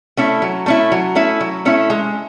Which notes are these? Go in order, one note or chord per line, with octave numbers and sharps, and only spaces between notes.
A3 C#4 E4
F#3
A3 C#4 E4
F#3
A3 C#4 E4
F#3
A3 C#4 E4
G#3